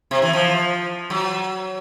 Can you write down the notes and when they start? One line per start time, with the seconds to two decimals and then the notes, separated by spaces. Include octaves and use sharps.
0.11 C3
0.22 E3
0.33 F3
1.10 F#3